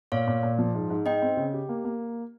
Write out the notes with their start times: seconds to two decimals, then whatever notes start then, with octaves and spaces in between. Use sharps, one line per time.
0.12 A#2 C#5 F5
0.27 A#2
0.43 A#2
0.59 F3
0.75 G#2
0.90 G#2
1.06 D#4 D#5 G5
1.22 C4
1.37 C#3
1.53 G4
1.69 A#3
1.84 A#3